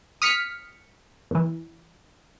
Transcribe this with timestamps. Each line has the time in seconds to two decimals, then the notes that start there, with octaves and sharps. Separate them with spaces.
0.22 D#6 F6 B6 C#7
1.31 E2 E3